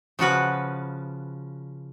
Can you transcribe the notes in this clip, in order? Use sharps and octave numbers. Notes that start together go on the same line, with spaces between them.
C#3 F3 F#4 B4